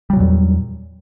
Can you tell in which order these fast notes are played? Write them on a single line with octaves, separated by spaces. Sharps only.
G3 F#3 A#2 E2